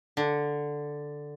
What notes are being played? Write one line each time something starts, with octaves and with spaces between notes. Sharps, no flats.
D3